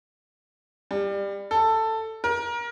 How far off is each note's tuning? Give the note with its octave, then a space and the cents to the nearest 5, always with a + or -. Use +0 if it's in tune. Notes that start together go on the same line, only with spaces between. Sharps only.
G3 +20
A4 +10
A#4 +25